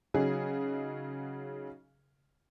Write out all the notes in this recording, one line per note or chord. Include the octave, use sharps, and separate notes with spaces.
C#3 F#3 D#4 G#4